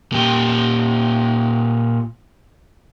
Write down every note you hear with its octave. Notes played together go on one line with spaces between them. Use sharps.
A#2 G4